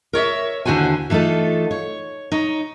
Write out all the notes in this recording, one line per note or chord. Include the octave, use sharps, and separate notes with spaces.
A#4 C#5 D5 E5
D#2 D3 E4 F#4 C5 G#5
E3 A3 D#4 F4 A4
C#5
D#4 C#5